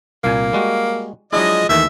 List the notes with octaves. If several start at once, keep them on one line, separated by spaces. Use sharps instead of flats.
C2 A#2 A#3 G#5
G3 G#3 F#4
F3 F#3 G#3 D4 E4 D#5
D#2 D#3 E3 A3 E5